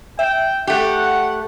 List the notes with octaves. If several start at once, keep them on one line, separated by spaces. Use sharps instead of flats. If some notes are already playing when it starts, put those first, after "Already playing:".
E5 G5
A3 G4 F#5